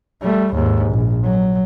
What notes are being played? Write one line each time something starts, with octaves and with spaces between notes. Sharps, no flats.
G3 A3
D#2 G#2
A#1
F#3